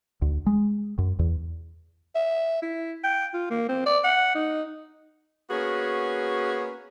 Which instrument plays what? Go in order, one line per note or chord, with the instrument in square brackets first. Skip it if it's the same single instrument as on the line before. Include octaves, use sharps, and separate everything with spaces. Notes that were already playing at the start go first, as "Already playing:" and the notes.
[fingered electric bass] D2
G#3
F#2
E2
[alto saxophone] E5
E4
G5
F4
A#3
C4
D5
F#5
D#4
[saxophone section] A#3 B3 C#4 F#4 G#4